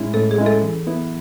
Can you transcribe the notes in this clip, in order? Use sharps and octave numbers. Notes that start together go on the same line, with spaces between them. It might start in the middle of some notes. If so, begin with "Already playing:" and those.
Already playing: A2 G#3 C#4 E4
A2 A4
G#4
G#3 C#4 E4
A4
E3
B3 E4